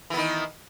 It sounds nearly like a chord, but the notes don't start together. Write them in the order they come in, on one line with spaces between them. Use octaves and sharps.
E3 B3 D#3